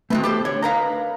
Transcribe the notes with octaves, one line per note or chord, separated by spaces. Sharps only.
D#3 A3 B3 C4 F#4 B4
G4 A4 C5
D3 C#5
D#4 A#4 B4 F5 A#5